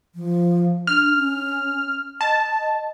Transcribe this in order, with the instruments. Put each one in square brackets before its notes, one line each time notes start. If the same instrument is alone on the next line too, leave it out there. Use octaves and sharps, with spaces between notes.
[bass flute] F3
[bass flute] D4 [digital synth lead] F6
[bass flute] C#4
[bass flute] D#5 [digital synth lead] A5